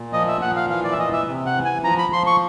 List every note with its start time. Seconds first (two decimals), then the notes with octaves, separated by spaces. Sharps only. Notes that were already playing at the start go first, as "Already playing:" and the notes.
Already playing: A#2
0.13 F3 D#5
0.28 E5
0.41 A#2 F#5
0.56 F5
0.70 E3 F5
0.84 D5
0.92 E5
0.98 E3 D#5
1.13 E5
1.27 C3
1.46 F#5
1.56 E3
1.65 G#5
1.84 F3 A#5
1.98 B5
2.13 F3 C6
2.27 C#6